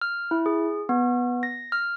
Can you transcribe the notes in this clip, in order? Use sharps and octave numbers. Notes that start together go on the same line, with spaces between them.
F6
E4
G#4
B3
A#6
F6